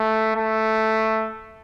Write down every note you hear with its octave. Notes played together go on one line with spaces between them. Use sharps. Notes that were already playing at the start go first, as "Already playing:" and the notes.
Already playing: A3
A3